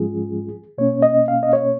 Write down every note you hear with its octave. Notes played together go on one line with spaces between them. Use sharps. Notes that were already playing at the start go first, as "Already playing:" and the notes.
Already playing: G#2 F3 G#3 C#4 F4 G#4
B2 A#3 C#4 C#5
D#5
F5
D#5
C#5